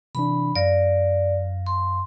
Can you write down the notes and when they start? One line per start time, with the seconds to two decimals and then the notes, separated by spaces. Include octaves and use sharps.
0.15 C3 E3 D4 B5
0.56 F#2 D5 F5 A#6
1.67 C6